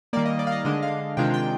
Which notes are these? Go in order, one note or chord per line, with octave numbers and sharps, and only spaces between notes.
D#3 G3 A#3 D5
D#5
D5
F5
D#5
D3 G#3 D4 D#5
F5
C3 D#3 G#3 D4 F4 G5
G5